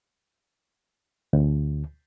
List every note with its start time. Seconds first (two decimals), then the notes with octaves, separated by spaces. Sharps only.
1.33 D2